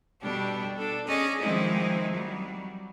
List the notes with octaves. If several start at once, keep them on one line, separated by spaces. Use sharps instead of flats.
B2 G3 D4 G4 A4
D4 A4
C#4 G#4 D5 D#5
D#3 F3 G#3 C4 D#4 E4
F#3 G3